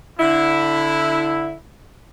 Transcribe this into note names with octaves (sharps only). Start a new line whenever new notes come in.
D3 E4